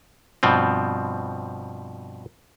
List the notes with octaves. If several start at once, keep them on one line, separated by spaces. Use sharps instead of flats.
G2 B2 F3 C4